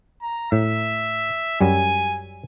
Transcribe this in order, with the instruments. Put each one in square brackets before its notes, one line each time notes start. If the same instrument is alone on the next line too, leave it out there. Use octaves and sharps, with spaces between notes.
[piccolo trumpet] A#5
[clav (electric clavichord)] A2 [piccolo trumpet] E5
[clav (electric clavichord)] F#2 F#3 G3 [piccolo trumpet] G#5